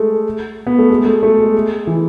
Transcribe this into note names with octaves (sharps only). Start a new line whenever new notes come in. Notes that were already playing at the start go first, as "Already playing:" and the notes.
Already playing: G#3 A3
B3
A3
G#3
A3
A3
G#3
E3